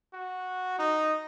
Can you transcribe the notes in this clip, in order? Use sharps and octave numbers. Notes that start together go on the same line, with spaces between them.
F#4
D#4